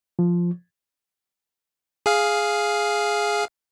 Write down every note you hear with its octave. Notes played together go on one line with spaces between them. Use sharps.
F3
G#4 F5